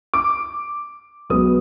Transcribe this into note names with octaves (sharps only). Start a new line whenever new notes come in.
D6
B1 B2 G#3 B3 D#6